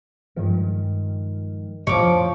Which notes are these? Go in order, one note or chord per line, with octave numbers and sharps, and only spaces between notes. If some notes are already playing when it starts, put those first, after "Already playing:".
G2 D#3 F3 G#3
F2 A2 D3 F3 C#5 D6